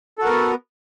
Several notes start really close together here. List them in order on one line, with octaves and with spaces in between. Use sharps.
A4 F#4 A#4 B3